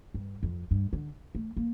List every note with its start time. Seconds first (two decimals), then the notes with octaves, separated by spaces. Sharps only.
0.14 G2
0.43 F2
0.71 G2
0.93 D3
1.35 A3
1.57 A#3